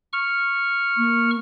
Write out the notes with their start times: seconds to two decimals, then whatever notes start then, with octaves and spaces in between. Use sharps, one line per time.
0.13 C#6 F6
0.97 A#3